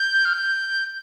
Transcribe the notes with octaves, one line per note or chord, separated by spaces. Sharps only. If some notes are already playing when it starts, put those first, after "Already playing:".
Already playing: G6
F6
G6